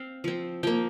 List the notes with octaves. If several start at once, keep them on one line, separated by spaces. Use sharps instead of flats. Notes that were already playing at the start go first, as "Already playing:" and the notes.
Already playing: C4 F5
F3 C4
F3 A#3 G5